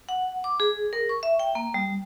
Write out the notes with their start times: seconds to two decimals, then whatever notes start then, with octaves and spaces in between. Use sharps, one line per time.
0.09 F#5
0.44 D6
0.60 G#4
0.93 A#4
1.09 C#6
1.23 E5
1.39 G5
1.55 A#3
1.74 G3